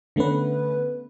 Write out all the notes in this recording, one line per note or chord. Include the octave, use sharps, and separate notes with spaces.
D3 A3 B3 C#4 B4